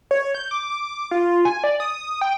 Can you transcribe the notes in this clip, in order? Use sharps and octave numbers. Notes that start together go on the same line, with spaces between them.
C#5
G6
D6
D6
F4
G#5
D5
D#6
G5